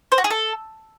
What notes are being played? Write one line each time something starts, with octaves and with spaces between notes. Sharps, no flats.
C5
F#4
G#4
A4